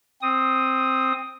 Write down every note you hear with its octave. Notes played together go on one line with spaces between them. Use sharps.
C4 D#6